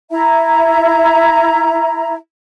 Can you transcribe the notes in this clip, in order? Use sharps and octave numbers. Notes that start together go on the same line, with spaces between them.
E4 E5 A#5